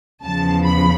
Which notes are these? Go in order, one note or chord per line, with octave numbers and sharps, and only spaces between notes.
E2 C#3 F3 A5
B5